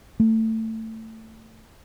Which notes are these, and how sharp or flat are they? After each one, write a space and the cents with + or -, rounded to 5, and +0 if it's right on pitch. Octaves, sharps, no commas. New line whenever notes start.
A3 +20